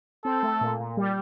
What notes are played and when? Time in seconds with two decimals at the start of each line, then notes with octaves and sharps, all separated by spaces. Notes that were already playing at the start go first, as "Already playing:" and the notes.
0.24 C4 A4
0.43 A3
0.61 A#2
0.80 A#2
0.97 G3